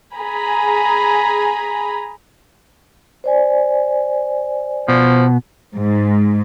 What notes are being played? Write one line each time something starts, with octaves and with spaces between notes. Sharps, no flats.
G#4 G#5 A#5 B5
C5 D5 G#5
B2 F3
G#2